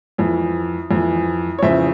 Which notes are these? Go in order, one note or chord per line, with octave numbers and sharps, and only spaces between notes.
F2 E3
F2 E3
C#5
F2 C#3 E3 C5 E5